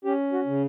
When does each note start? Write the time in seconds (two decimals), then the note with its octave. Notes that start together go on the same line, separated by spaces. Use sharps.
0.05 C#4 G4
0.32 F#4
0.46 C#3